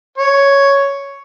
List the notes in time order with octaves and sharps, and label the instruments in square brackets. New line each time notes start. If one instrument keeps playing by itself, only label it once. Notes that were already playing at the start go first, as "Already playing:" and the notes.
[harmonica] C#5